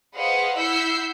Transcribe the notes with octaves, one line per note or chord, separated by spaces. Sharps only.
G#4 B4 C5 D#5 F5 F#5
E4 F#5 E6 G6 B6 C7